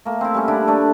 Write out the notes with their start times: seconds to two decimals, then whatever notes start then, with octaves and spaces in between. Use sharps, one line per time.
0.05 A3 A#3
0.21 C4 E4
0.34 G3 C#4
0.48 D3 D4 E4 D5
0.68 A3 D4 B4